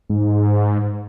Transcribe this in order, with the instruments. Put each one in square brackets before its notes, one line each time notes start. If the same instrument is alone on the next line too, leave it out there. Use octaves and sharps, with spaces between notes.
[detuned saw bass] G#2